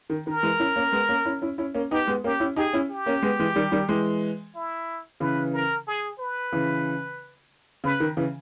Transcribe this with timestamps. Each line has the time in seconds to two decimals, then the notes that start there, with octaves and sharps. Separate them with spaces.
0.10 D#3
0.27 D#3 A#4
0.43 E3 G#3
0.60 C#4 E4
0.76 A#3 C#4
0.92 G#3 B3
1.09 A#3 C#4
1.25 C#4 E4
1.42 C#4 E4
1.58 C#4 E4
1.74 A#3 C#4
1.91 B3 D#4 G4
2.07 G#3 B3
2.24 A#3 C#4 G4
2.40 C#4 E4
2.56 D#4 G4 G#4
2.73 C#4 E4
2.90 G4
3.06 A#3 C#4
3.22 G#3 B3
3.39 E3 G#3
3.56 D#3 G3
3.72 D#3 G3
3.89 E3 G#3
4.55 E4
5.20 C#3 E3 B4
5.53 A#4
5.87 G#4
6.19 B4
6.52 C#3 E3
7.84 C#3 B4
8.00 D#3
8.17 C#3 E3